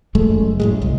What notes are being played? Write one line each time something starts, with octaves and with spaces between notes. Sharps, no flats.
F#1 F#2 G#3 A3
F#2 A2 G#3
C2